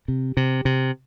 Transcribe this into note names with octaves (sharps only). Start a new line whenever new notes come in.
C3
C3
C3